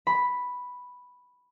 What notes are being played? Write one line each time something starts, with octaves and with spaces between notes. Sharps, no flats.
B5